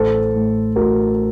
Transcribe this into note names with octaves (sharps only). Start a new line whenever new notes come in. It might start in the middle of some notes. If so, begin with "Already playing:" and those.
Already playing: A1 A4 C5
A2
A1 F#4 A#4